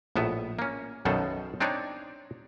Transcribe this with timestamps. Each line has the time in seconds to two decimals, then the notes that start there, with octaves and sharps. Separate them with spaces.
0.16 A#1 A2 B3 E5
0.59 A#3 C#4
1.05 B1 F#2 B2 D#3 A4 C5
1.60 C4 D4 D#4 C#5 D5